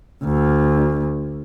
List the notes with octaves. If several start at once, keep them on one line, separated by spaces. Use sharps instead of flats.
D2